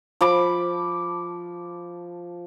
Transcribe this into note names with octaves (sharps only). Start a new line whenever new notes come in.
F3 B5 D6